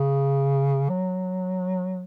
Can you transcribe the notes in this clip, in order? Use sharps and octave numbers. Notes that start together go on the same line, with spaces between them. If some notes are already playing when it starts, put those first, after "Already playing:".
Already playing: C#3
F#3